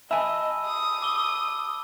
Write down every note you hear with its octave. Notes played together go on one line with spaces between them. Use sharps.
D#5 E5 G#5 A5 B5 E6
D#6
D6 E6 G7